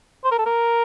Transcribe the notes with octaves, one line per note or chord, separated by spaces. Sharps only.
C5
A#4
A4
A#4